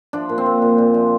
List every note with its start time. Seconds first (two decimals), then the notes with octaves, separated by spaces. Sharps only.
0.13 F3 D4
0.29 A#2
0.38 C4
0.46 A#2
0.62 A#2
0.78 A#2
0.94 F3